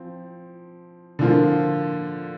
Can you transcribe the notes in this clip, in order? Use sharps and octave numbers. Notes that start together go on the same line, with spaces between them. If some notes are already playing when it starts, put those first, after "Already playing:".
Already playing: F3 C4
D3 F3 A#3 F4